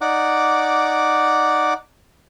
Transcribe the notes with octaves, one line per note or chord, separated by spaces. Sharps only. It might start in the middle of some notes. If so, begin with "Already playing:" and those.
D#4 D5 F#5 D6